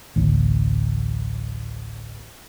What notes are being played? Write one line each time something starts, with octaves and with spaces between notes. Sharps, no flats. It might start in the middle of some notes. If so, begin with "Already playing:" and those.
A1 D2